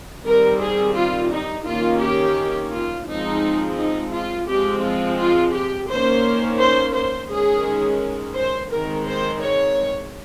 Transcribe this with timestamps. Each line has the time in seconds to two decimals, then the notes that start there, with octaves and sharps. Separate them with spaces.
0.25 D#3 G3 C4 A#4
0.60 G#4
0.95 F4
1.31 D#4
1.66 D#3 A#3 C#4 F4
2.01 G4
2.72 F4
3.07 F3 G#3 C4 D#4
3.78 D#4
4.13 F4
4.48 F3 G#3 C4 G4
4.83 F4
5.18 F4
5.53 G4
5.89 D#3 A#3 C#4 C5
6.59 C5
6.95 C5
7.30 D#3 G#3 C#4 G#4
8.36 C5
8.71 D#3 G#3 C4 A#4
9.06 C5
9.41 C#5